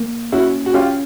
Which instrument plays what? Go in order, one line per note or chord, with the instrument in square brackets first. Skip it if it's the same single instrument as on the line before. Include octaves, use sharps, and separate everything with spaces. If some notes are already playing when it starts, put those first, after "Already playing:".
Already playing: [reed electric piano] A#3
[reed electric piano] C#4 [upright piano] E4 F#4
[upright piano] F#4
[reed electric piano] C#4 [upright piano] F4 G4